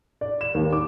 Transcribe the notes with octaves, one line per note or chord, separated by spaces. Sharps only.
D5
E7
D#2
D6